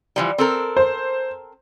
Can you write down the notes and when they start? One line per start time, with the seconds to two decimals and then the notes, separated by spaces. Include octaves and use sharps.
0.16 E3 F3 G3
0.38 C4 A4 A#4
0.77 C5